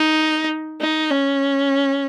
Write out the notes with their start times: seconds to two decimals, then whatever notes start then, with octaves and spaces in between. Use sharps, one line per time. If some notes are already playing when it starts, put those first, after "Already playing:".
Already playing: D#4
0.81 D#4
1.11 C#4